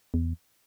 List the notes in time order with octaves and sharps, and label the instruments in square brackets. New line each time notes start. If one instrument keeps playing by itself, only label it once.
[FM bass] E2